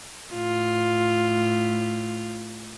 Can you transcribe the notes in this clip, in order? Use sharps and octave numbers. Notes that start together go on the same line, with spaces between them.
A2 F4